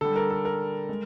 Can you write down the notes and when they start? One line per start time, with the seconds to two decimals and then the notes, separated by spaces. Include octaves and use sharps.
0.01 D3 G3 A4
0.16 A#4
0.30 A4
0.45 A#4
0.89 G#3